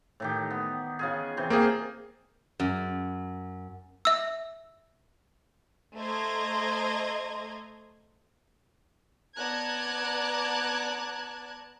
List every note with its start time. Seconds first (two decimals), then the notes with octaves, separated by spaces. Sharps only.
0.20 A2 D#3 G4
0.50 B3
0.99 C#3 F4 G#4
1.37 C3 E3 C5
1.50 A#3 C4 F4 G4 G#4
2.60 F#2
4.05 E5 E6
5.97 A3 C5 D#5 A#5 C6 G#6
9.37 B3 D5 A5 A#5 F#6 G#6